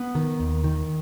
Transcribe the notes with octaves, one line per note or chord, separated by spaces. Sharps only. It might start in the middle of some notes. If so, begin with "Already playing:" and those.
Already playing: B3
D#3
D#2
D#3